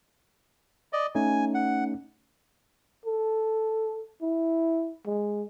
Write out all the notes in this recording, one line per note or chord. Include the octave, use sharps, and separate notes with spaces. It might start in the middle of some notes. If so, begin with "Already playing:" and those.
D5 D#5
A3 C#4 D#4 G#5
F#5
A4
E4
G#3